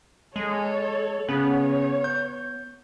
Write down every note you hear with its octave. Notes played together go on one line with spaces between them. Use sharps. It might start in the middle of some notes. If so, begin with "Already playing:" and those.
G#3 A4 C#5
C#3 B3 C#5
G6